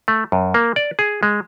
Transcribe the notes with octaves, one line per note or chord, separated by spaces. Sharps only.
A3
F#2
A#3
D5
G#4
G#3